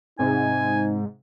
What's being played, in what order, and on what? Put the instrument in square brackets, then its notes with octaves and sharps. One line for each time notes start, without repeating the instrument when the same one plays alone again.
[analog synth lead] G#2 [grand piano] C3 [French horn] D#4 [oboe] G#5